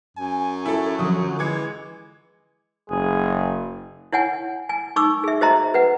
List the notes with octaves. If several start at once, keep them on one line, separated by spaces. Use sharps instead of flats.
F#2 G#5
E4 A4
D3 F3 F#3 F#4 D#6
E3 G#3 D6 G#6 C#7
F#1 G#4
E4 C#5 F#5 G#5
G#5
D#4 C#6 D6 E6
G#4 E5
F#4 C5 D#5 E5 A#5 C6
B4 F#5